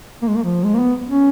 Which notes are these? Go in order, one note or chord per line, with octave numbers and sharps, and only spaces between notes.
A#3
G#3
A#3
F3
G#3
A#3
B3
C#4